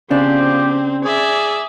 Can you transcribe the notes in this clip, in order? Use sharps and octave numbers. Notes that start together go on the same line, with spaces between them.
C#3 F3 B3 C4 D4 G4
G#4 D5 E5